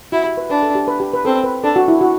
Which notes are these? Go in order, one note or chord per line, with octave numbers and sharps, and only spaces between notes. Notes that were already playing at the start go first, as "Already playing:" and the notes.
E4 F#4
G4
B4
D4 B4
A4
G4
B4
G4
B4
C4 A4
B4
D4 A4
F#4
E4
F#4